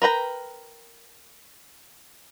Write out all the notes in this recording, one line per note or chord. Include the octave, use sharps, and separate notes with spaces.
A#4 B4 G5 A#5